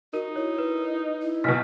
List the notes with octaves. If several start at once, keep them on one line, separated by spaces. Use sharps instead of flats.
D#4 F#4 A#4
E4 C#5
B4
E4
B1 B2 D#5 F6 B6